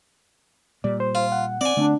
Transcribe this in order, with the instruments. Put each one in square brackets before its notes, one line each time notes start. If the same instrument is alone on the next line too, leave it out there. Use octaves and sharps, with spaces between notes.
[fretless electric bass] A#2 G3 [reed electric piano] D5
[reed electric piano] C5
[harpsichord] F4
[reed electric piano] F#5
[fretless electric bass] C4 [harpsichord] D5 G#5
[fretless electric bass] D3 A3 C4 [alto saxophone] D4